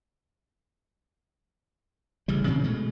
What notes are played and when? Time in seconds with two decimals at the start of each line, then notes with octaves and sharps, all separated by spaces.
2.28 A1 C#3 G3
2.45 A#2 C#3 E3 C4
2.64 B2 G#3 A3